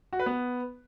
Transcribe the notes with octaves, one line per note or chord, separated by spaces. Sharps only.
F#4
B4
B3